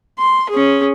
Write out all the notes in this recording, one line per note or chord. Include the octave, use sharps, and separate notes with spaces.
C6
C#4 G#4